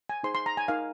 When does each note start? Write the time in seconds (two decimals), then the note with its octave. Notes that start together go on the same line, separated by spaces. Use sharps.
0.09 G#5
0.23 D#4 G#4 C5 C6
0.35 C6
0.46 A#5
0.57 G#5
0.68 D#4 A#4 F5